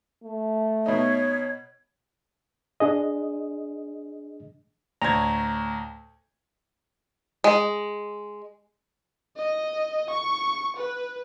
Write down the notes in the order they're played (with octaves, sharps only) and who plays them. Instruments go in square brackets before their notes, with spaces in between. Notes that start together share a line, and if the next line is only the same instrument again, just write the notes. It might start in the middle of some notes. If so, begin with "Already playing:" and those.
[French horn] A3
[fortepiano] B2 D#4 [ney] C#5
[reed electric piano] D4 G#4 D#5
[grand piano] D2 A2 G#6 [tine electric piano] A#5
[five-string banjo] G#3
[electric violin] D#5
C#6
B4